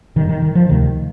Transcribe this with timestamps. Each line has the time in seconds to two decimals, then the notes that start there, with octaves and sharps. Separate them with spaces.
0.16 G1 G2 D3 D#3
0.29 D#3
0.42 D#3
0.55 F3
0.69 D2 C3 D#3